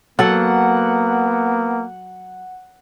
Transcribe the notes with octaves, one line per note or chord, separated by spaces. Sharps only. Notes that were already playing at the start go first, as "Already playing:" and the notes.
F#3 A#3 B3 A4 F#5